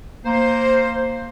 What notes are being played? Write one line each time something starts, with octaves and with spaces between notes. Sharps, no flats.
A#3 C5